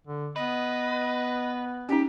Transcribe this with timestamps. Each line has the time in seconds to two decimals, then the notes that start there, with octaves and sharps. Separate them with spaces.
0.07 D3
0.36 B3 B4 D#5
1.89 C#4 D#4 G4